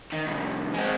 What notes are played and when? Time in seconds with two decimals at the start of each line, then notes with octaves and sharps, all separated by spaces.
0.12 D#3
0.26 C2 F2
0.74 G#3 C4